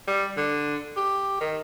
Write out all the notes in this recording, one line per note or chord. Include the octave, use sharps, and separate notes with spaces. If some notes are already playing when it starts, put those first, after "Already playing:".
G3
D3
G4
D#3